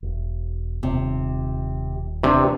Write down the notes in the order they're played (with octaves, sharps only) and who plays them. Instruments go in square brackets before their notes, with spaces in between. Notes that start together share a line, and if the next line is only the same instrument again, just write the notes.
[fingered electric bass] E1
[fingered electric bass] D#1 [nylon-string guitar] C3
[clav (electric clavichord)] C3 [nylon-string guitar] E3 D4